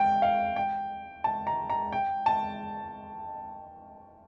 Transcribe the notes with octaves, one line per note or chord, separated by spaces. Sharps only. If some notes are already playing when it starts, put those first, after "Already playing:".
Already playing: G5
F5
G5
A5
A#5
A#5
G5
A5